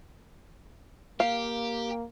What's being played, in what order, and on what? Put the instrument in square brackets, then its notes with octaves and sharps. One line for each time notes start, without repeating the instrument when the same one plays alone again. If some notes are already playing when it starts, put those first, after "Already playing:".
[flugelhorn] A#3 [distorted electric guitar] G4 [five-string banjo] F5